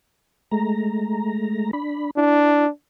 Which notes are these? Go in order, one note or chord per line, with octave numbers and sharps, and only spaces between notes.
G#3 A3 A#5
D4 B5
D4 E4